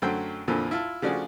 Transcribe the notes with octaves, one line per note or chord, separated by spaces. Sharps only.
F#2 D3 F#3 A3 C5 G5
F2 A#2 D3 E3 F3
E4 F4 A5
C#3 F3 A3 D4 F#4 G#4